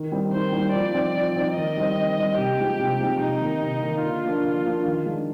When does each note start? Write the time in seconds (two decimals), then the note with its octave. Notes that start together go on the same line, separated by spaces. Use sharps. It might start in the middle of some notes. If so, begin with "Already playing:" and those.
Already playing: D#3
0.12 G3 C4 D#4
0.32 D#3 C5
0.52 G3 C4 D#4
0.73 F3 D5
0.94 C4 D#4
1.15 F3
1.36 C4 D#4
1.56 D#3 D#5
1.77 G3 C4
1.97 D#3
2.18 G3 C4
2.38 C3 G4
2.59 F3 G#3 C4 D#4
2.79 C3
3.00 F3 G#3 C4 D#4
3.20 C3 D#4
3.41 D#3 A#3
3.62 C3
3.82 D#3 A#3
4.03 D3 F4
4.24 F3 A#3 D4
4.44 D3
4.65 F3 A#3 D4
4.85 D#3
5.06 G#3 D4